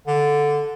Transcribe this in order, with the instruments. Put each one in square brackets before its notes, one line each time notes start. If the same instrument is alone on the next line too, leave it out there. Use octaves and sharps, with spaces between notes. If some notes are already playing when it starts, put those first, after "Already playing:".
[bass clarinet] D3